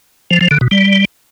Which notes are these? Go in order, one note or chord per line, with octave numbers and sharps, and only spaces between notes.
F3
F3
D3
B2
G3